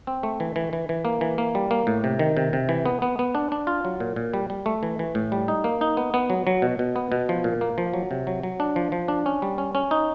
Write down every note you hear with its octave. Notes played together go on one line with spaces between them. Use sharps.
C4
A3
E3
E3
E3
E3
A#3
E3
A#3
G3
A#3
A2
C3
D#3
C3
C3
E3
B3
B3
B3
D4
D4
F4
F#3
A#2
A#2
G3
G3
A3
E3
E3
A2
G3
D#4
A#3
D#4
B3
B3
F#3
F#3
B2
B2
B3
B2
F3
A#2
A#3
F3
F#3
C3
F#3
F#3
D4
F3
F3
D4
C#4
G3
C#4
C#4
D#4